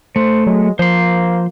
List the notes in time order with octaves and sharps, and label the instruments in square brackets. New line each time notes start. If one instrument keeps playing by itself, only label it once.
[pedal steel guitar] A3 [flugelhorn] C5
[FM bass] F#3 [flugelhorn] G#3
[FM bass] F3 [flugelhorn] A#3 [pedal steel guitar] C5 C6